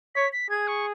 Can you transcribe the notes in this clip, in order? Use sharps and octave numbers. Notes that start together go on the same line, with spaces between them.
C#5 B6
B6
G#4 G#6
C#6